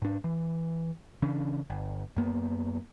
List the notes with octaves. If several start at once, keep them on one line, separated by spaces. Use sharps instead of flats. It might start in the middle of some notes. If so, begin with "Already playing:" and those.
G#2 D4
E3
C#3 E3 C#4 D4
G1
F#2 A#3 B3